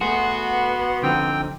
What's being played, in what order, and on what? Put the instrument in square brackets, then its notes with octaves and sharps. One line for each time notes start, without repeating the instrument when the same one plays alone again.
[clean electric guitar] A3 G#4 [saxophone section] B3 [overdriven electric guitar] F#4 [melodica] C6
[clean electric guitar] D3 F3 D#4 [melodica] C4 G5